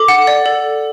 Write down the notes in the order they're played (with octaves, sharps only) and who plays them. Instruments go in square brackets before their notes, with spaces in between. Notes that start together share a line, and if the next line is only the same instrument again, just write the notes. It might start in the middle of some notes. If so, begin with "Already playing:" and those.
Already playing: [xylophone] A4 D6
F#5
D5
A4